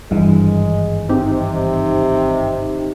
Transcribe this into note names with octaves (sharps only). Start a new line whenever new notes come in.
G#1 G2 E3 G#3
C3 C4 D#4 G4